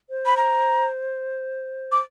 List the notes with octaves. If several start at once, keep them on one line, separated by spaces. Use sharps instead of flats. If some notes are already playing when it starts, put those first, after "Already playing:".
C5
B5
A#5
D6